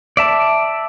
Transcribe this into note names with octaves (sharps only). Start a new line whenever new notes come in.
D5 E5 A5